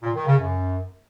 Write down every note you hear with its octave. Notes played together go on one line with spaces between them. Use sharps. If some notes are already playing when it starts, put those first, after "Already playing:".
A#2
D#3
C#3
F#2